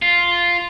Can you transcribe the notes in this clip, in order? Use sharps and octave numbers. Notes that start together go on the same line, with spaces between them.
F4